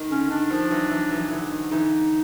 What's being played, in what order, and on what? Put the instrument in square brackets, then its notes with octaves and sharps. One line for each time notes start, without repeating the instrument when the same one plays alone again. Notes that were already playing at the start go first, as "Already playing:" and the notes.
Already playing: [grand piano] D#3
[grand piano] D3 [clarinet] C#4
[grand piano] D#3 [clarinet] D4
[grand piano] D#3 F3
E3 F#3
E3 F#3
E3 F#3
D3 E3
D#3
[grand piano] D3 E3 [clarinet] D#4